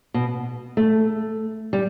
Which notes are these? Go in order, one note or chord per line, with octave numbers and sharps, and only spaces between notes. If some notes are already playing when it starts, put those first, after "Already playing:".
B2
A3
G3